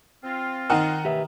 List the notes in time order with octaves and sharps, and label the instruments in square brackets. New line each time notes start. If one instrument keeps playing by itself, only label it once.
[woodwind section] C4 F4
[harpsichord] D#3 [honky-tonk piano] D#4 F#5
[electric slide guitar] G4 B4 E5